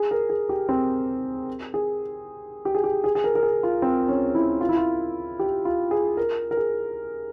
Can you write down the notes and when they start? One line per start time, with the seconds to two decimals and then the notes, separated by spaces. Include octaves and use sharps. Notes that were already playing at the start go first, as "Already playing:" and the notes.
Already playing: G#4
0.11 A#4
0.30 G#4
0.49 G4
0.69 C4
1.74 G#4
2.65 G4
2.75 G#4
2.84 G4
3.04 G#4
3.15 G#4
3.24 A#4
3.35 A#4
3.43 G#4
3.63 F4
3.82 C4
4.08 C#4
4.35 E4
4.61 F4
4.69 E4
4.77 F4
5.39 G4
5.65 F4
5.91 G#4
6.17 A#4
6.51 A#4
6.57 G#4